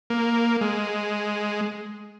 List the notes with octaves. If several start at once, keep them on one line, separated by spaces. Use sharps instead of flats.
A#3
G#3